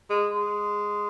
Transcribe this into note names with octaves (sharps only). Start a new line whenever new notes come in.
G#3
G#3